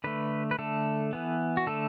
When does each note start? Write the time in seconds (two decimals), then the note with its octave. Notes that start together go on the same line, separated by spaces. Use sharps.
0.04 D3 A3 B4
0.51 B4
0.59 D3 A3 A4
1.13 E3 B3
1.57 F#4
1.67 D3 A3 A4